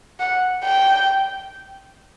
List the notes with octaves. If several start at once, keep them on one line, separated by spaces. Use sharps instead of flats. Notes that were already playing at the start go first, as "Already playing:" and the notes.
F#5
G5